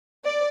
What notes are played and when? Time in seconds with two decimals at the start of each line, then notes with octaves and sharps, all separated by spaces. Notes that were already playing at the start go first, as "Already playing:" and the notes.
0.25 D5